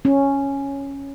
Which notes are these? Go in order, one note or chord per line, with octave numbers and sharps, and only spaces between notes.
C#4